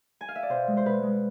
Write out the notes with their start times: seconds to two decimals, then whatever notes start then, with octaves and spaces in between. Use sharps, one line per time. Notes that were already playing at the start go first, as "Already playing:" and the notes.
0.21 G#5
0.28 F5
0.35 E5
0.43 D5
0.49 B2 C5
0.67 G#3
0.77 C5
0.85 B2 B4
1.03 G#3